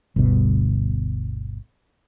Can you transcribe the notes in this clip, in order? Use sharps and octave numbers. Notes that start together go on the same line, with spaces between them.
G1 D2 B2